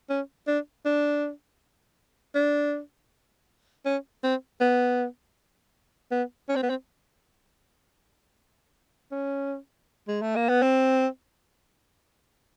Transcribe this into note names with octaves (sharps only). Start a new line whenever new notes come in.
C#4
D4
D4
D4
C#4
C4
B3
B3
C#4
C4
B3
C4
C#4
G#3
A3
A#3
B3
C4